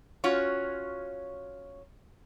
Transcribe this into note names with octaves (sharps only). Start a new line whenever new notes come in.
C#4 F4 F#4 C#5